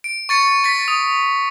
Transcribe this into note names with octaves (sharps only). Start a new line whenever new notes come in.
D7
C#6 A6 C#7
A6 B6
D#6